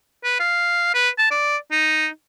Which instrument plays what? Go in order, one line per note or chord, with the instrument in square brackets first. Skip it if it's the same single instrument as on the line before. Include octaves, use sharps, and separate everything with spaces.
[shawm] B4
F5
B4
A5
D5
D#4